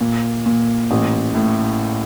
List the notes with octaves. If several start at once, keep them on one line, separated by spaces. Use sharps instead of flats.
A#2
A#2
A1
A2